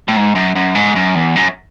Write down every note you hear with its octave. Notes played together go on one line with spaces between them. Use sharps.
A2
G#2
F#2
F#2
G#2
F#2
E2
F#2